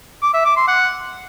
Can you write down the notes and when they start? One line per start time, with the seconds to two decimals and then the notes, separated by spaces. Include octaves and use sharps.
0.22 D6
0.34 E5
0.45 D6
0.56 C6
0.68 F#5